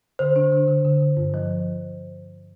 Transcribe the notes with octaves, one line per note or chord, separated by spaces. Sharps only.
D3 C5
D4
D3
D3
D3
D3
G2
F3